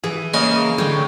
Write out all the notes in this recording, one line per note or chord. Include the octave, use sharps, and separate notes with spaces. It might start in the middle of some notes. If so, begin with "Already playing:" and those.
E3 G#4
C#3 A#3 D#5 G#5
A2 D3 G4 C#5 G5